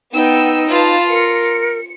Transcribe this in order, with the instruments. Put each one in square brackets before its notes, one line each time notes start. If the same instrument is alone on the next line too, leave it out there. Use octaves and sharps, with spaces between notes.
[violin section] B3 G5 E6 [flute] D#4
[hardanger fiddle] F4 [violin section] B4 F5 A5
[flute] A#4 [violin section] C#7